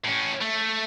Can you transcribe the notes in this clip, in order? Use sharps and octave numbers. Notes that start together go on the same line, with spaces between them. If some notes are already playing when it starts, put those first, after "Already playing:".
A2 C#4
A3